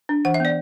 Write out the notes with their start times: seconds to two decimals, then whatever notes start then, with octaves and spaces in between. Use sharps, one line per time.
0.09 D4
0.25 E3 F#5
0.34 E5
0.40 B3 D5